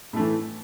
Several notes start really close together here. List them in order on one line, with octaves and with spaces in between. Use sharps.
A2 A3 E3